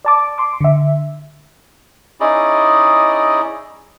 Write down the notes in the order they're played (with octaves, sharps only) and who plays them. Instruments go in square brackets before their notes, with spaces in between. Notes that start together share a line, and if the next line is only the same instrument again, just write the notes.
[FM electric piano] D5 A5 D6
C6 D6
D3 E5
[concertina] C#4 D#4 E4 G#4 D5 D#5